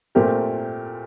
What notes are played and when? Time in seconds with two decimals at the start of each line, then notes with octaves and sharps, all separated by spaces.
0.15 A#2 A3 C4 G4 A#4